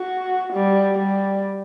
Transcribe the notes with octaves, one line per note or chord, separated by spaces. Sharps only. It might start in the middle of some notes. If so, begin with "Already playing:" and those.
Already playing: F#4
G3
G3